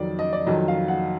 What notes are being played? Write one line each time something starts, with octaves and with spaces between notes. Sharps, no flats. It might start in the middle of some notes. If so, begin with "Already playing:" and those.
Already playing: F2 D#3 F#3 D5
D#5
D5
F2 D#3 F#3 D#5
F5
F#5